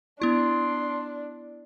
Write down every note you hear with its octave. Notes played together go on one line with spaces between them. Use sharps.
B3 D4 E4 C6